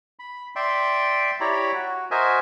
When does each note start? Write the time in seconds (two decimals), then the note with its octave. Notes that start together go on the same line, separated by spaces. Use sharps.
0.19 B5
0.56 D5 E5 G5 C6
1.40 E4 G4 C#5 D5 A#5 B5
1.74 F#4
2.11 F#4 A#4 C5 D#5 E5 G#5